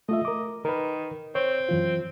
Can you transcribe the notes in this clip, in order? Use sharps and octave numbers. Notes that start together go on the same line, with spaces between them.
A3 F4 D#5 E5
A#4 D6
D#3 A#4 B4
C4 C#5
F#2 E3 F4